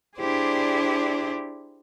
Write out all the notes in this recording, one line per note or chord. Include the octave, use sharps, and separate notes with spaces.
D4 E4 G4 G#4 C5 D5